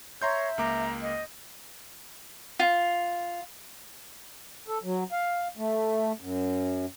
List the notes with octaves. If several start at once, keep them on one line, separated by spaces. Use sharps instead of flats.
C#5 E5 A#5 C6 G6
C#2 A#3 A#5 D6
D#5
F4
A4
F#3
F5
A3
F#2